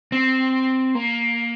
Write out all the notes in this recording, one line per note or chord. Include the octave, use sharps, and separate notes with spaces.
C4
A#3